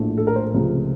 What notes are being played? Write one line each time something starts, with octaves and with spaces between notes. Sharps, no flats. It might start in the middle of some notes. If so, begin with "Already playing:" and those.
Already playing: A#1 A2 A3
A4
A#4
C5
C#2 C3 F3 A3